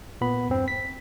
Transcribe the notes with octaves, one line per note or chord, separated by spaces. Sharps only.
A#2 B3 B5
E2 G2 C4
B6